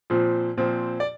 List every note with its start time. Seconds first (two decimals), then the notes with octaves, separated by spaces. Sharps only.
0.10 A#2 F3 C4
0.57 A#2 F3 C4
1.00 D5